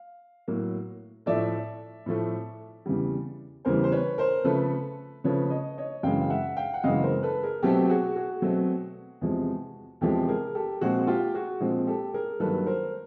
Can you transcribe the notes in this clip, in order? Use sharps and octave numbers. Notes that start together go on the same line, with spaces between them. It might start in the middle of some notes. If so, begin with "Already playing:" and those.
Already playing: F5
A2 F#3 A#3
A2 F3 A3 D5 E5
A2 F3 A3
E2 C#3 E3 G3
E2 C#3 E3 G3 A#4 C5
C5
B4 C#5
A#4 C5
C#3 F3 A3 A4 B4
C#3 F3 A3 B4 C#5
C#5 D#5
C#5 D#5
F#2 C#3 E3 G#3 F5 G5
F5
E5 F#5
F5 G5
F#5
F#2 C#3 E3 G#3 D#5 F5
A#4 C5
A4 B4
G#4 A#4
B2 F#3 A3 C4 G4 A4
F#4 G#4
F#4 G#4
B2 F#3 A3 C4
E2 C3 F3 G#3
E2 C3 F3 G#3 G4 A4
G#4 A#4
G4 A4
A#2 F3 G#3 C4 F#4 G#4
F4 G4
F#4 G#4
A#2 F3 G#3 C4
G4 A4
G#4 A#4
G2 D#3 F#3 A#3 A4 B4
A#4 C5